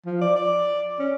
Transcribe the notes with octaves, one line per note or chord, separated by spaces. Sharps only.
F3
D5
D5
C#4